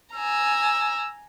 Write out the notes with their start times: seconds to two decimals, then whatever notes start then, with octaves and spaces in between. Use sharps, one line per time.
0.14 G#5 A#5 E6